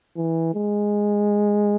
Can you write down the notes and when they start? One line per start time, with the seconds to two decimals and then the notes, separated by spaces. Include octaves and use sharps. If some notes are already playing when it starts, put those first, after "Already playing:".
0.17 E3
0.54 G#3